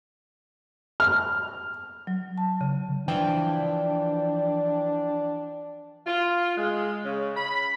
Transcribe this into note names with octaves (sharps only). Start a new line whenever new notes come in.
F6
F#3
A5
C#3
E3 F3 D4 G5
F4
G#3
C#3
B5